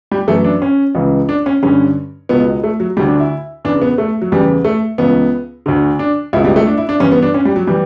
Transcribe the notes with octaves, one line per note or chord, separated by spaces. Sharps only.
G3
F#2 E3 A3
D4
C#4
C#2 C#3 E3
D4
C#4
G2 D3 C#4
C#2 B2 B3
A3
F#3
D2 D3 G3
D4
E4
E2 C#3 E3 D4
B3
A3
F#3
E2 C#3 E3 G3
A3
C#2 C#3 E3 B3
D2 D3
D4
C#2 B2 E4
G3
A3
D4
E4
D4
G2 E3 C#4
B3
D4
C#4
G3
F#3
E3 G3